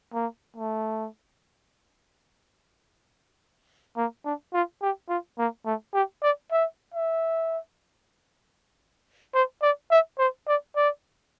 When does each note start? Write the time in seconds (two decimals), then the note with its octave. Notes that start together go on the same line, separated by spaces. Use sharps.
0.14 A#3
0.57 A3
3.97 A#3
4.25 D4
4.54 F4
4.82 G4
5.09 F4
5.39 A#3
5.66 A3
5.94 G4
6.22 D5
6.52 E5
6.94 E5
9.34 C5
9.62 D5
9.91 E5
10.19 C5
10.48 D5
10.76 D5